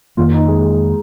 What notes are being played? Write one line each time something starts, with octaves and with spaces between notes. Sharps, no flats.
F2 D#3 A#3 F4
D#4
G#3
G#3